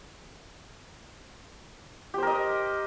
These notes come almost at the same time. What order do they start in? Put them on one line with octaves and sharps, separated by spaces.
G4 C5 A#4 D#5